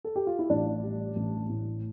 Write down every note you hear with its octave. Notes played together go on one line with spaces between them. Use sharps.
A4
G4
F4
E4
A1 D4
G3
A1
A2